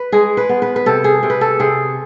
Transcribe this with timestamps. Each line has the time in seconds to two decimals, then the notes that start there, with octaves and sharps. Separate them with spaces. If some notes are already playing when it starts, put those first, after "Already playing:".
Already playing: B4
0.12 G#3 G#4
0.37 B4
0.49 B3
0.62 B4
0.76 B4
0.86 C3 A4
1.04 G#4
1.23 C3
1.30 B4
1.41 A4
1.60 C3 G#4